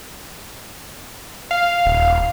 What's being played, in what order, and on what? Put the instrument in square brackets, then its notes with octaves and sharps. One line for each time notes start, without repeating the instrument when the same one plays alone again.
[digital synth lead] F5
[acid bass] D#1